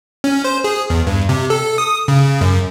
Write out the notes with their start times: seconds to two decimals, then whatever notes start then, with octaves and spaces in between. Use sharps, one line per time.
0.24 C#4
0.44 C5
0.64 G#4
0.90 E2
1.07 G2
1.29 C3
1.50 A4
1.78 D#6
2.08 C#3
2.41 F#2